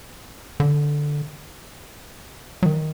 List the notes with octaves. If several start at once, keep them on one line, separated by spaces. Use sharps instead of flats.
D3
F#3
D#3